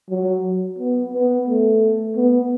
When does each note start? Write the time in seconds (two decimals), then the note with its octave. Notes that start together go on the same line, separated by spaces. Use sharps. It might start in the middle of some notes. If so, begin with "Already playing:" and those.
0.10 F#3
0.79 B3
1.13 B3
1.48 A3
2.17 B3